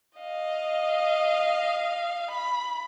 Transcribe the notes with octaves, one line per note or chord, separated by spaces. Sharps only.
D#5 F5
B5